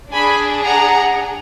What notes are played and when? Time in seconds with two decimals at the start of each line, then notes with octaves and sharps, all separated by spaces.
0.13 D4 G#4 G#5 B5
0.65 F#5 A#5